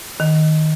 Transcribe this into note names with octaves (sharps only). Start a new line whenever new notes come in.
D#3